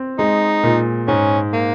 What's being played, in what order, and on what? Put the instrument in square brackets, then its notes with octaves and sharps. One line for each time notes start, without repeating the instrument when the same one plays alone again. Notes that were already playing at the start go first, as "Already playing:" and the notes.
Already playing: [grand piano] C4
[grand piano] G#3 [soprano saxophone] D#4
[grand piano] A#2
[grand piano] G#2 [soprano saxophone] C#4
[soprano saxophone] A#3